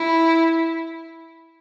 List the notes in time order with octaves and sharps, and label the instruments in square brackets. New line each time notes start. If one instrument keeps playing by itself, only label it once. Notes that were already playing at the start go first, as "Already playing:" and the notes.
Already playing: [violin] E4